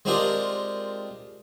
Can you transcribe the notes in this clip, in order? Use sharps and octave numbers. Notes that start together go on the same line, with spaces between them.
G#3 C4 D4 F4 G4 A#4